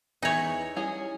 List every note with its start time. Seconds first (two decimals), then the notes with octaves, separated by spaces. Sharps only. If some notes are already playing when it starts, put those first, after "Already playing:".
0.22 E2 E3 D#4 E4 C#5
0.76 G3 C#4 E4 G#4